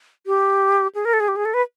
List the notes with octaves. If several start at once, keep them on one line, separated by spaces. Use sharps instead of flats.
G4
G#4
A#4
A4
G#4
G4
G#4
A4
B4